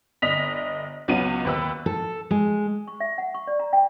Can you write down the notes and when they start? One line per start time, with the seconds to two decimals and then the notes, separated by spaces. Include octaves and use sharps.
0.22 G1 D5 D#5 B6 F7
1.08 C#2 F#3 B3 C#4 D#7
1.45 D#2 B4 E6
1.86 A4
2.31 G#3
2.87 C#6
3.00 E5
3.18 F#5
3.34 C#6
3.47 D5
3.60 A#5
3.73 G5